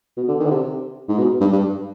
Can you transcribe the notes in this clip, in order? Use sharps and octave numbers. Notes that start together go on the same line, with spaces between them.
B2
D3
D#3
D3
C3
G#2
B2
G2
G2